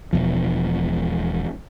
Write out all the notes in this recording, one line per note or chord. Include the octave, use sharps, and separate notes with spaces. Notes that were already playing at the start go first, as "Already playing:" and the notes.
E1 C2 B2 F3